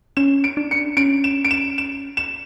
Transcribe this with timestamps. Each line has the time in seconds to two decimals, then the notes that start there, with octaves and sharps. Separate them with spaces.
0.17 C#4 E7
0.44 D7
0.57 D4
0.71 C#7
0.97 C#4 D7
1.24 E7
1.45 D7
1.51 E7
1.78 E7
2.17 E7